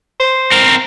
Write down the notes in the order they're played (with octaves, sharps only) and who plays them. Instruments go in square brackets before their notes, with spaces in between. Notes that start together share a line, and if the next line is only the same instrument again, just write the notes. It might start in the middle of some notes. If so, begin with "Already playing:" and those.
[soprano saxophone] C5
[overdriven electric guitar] C4 A#4